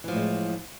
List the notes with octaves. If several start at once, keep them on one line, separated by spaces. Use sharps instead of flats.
A2 E3 F3 G#3